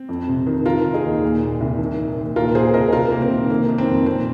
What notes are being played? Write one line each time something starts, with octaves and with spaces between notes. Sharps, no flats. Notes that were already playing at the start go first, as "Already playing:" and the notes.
Already playing: C4
F2
C3
D#3
D#3 F4 A#4
D#3
D#4 G#4
D#2
A#2
A#2
C2
D#3
D#3
D#2
A#2 F4 A#4
A#2 G#4 C5
C2 A#4 D#5
C2 F4 A#4
C3 A#3
C4
D#3
D#3 A#3
D#3
C4
F2
A#2 C4